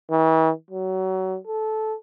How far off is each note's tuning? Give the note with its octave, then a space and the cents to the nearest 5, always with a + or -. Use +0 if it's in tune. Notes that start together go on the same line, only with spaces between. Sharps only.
E3 -45
F#3 +25
A4 -15